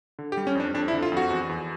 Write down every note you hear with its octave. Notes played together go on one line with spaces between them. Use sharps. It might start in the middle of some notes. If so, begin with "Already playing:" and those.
D3
G4
G3
C#4
F2 D4
F2 D4
E4
D3
F4
F2 F#4
E2
E2